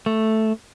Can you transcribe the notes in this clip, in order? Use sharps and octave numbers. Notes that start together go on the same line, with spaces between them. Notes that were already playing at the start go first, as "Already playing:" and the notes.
A3